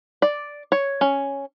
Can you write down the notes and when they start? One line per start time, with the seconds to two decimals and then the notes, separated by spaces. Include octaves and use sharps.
0.22 D5
0.72 C#5
1.01 C#4